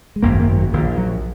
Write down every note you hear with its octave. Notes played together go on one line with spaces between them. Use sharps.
G#3
G#1 F#2 C#3 A#3
A#3
F#3
A#1 A#2 D#3
F#3